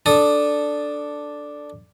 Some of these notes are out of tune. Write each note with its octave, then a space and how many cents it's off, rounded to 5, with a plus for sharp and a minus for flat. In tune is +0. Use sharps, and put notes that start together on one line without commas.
D4 +0 A4 +0 D#6 -20